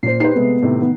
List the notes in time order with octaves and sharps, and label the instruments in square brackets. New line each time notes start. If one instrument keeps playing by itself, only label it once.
[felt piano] A#2 C5 [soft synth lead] C7
[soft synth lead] D#4 [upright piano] G4 C5 [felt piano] B4 C7
[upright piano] C3 G#3 A3 [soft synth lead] B3
[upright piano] A2 C3 D#3
[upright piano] D#3 [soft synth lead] B3